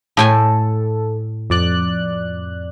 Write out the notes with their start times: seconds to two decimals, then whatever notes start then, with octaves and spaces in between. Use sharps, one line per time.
0.17 A2 A4 G5 G#5
1.50 F2 D5 F#6